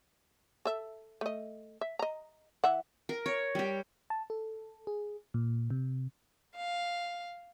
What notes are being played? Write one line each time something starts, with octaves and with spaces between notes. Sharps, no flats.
A4 E5
A3 D#5
E5
D#5 A#5
E3 E5 F#5
A#4
C#5
G3 G4
A5
A4
G#4
A#2
C3
F5